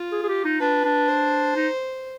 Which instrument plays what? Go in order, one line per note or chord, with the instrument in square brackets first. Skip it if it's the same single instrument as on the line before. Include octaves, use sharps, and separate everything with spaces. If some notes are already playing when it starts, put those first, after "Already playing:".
Already playing: [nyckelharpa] F4
[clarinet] G#4
G#4
G4
D#4
[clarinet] D4 [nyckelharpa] B4
[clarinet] D4
[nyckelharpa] C5
[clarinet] D#4